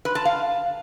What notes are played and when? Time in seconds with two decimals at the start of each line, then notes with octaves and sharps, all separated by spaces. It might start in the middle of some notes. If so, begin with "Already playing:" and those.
0.05 B4
0.15 A5
0.25 F5